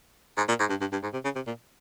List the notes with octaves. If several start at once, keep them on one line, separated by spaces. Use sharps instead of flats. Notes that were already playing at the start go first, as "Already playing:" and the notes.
G#2
A#2
G#2
G2
G2
G2
G#2
C3
C#3
C3
A#2